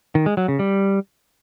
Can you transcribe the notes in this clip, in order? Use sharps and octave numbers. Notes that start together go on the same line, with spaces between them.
D#3
G#3
F#3
C#3
G3